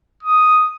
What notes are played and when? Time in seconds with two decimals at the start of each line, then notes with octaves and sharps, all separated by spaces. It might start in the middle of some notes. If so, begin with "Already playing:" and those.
0.23 D#6